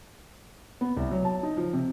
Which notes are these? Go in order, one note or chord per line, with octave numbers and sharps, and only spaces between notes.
B3
C2
F#3
A5
D#4
F3
C3